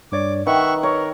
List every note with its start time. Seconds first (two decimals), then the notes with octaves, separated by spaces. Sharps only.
0.12 G2 C#5 D5 D6
0.47 D#3 B4 E5 F#5 C#6
0.83 A#4 C#5